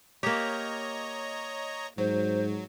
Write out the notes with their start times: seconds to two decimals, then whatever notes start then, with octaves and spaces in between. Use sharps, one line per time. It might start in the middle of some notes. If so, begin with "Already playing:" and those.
0.23 A#3 G4 C#5 D#5 A#5
1.98 G#2 F#3 C5